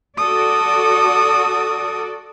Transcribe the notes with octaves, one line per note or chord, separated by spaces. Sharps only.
F#4 A4 D5 D#6